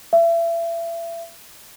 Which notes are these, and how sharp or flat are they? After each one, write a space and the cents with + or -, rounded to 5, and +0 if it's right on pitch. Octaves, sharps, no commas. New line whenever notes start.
E5 +35